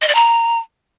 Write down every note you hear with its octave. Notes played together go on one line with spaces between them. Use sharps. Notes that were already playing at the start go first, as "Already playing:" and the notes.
D#5
D5
A#5